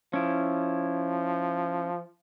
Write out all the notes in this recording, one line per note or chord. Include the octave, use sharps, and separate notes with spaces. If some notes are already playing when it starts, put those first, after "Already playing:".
F3 C#4 E4